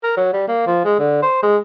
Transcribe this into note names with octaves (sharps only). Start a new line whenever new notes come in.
A#4
F#3
G3
A#3
F3
G#3
D3
C5
G#3